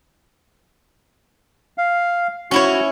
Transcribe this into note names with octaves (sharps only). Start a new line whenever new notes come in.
F5
C#4 E4 F#4 C#5 C#6